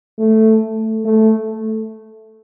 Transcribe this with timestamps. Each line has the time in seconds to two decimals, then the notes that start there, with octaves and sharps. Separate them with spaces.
0.18 A3
1.05 A3